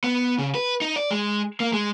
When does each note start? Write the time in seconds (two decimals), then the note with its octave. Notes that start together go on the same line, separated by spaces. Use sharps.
0.04 B3
0.39 C#3
0.55 B4
0.81 D#4
0.96 D5
1.11 G#3
1.60 A#3
1.73 G#3